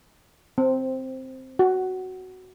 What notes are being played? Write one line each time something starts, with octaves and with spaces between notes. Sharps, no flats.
C4
F#4